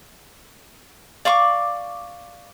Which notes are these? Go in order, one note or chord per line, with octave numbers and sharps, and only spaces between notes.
D5 F5 C#6 D6